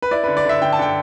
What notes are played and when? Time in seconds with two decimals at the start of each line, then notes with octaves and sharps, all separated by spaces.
0.02 B4
0.11 E4 D5
0.24 D3 B4
0.37 D5
0.45 D3 E5
0.61 D3 G5
0.72 A5
0.79 D3 G5